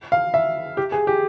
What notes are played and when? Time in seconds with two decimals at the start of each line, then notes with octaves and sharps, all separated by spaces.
0.12 F5
0.34 E5
0.77 G4
0.92 G#4
1.07 G4